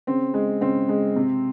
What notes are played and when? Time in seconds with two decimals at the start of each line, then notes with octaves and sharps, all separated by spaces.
0.07 C#3 C4
0.34 G#3
0.61 C#3 C4
0.89 G#3
1.16 C3